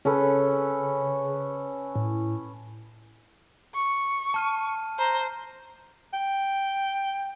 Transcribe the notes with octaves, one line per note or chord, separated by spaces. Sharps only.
C#3 C#4 A4 B4
A2
C#6
A5 F6 D#7
C5 A#5
G5